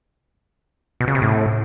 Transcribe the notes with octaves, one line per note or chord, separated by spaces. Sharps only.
B2
C#3
C3
A2